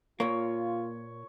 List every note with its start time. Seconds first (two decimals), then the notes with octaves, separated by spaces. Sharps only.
0.20 A#2 A#3 F4 C#5